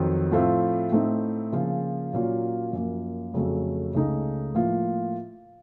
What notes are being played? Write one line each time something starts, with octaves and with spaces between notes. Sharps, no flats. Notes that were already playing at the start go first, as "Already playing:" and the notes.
Already playing: F2 D#3 F#3 C4
A2 F3 A3 C4 F4
A2 A3 C4 D#4
C#3 F3 A#3 F4
A#2 F#3 A#3 C#4 F4
F#2 F3 A#3
F2 C#3 F#3 A3
C#2 C#3 A3 D#4
A2 F3 A#3 F4